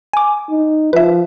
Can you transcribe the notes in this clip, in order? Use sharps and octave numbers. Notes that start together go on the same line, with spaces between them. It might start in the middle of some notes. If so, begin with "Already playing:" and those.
G#5 D6
D#4
F3 B4 E5